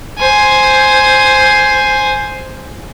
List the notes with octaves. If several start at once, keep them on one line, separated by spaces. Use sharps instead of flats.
C5 G#5